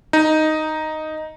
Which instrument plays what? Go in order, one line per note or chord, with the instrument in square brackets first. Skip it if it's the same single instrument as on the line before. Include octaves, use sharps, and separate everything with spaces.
[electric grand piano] D#4